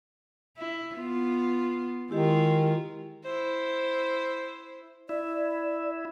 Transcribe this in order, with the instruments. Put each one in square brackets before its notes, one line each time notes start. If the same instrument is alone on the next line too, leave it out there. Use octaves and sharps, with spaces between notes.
[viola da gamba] E4
B3 F4
[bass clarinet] D#3 [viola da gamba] G#3 F4 [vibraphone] E4 G4 D#5
[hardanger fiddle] E4 C5
[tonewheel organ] E4 [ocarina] D5